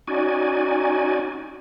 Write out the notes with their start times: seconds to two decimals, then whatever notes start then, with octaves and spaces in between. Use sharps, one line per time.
0.07 C#4 D#4 F#4 D5 G#5